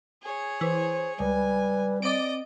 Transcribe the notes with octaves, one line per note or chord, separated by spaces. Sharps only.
G#4 C#5
E3 C5
C#2 G3 B4 G#5
C4 D5 D#5 D7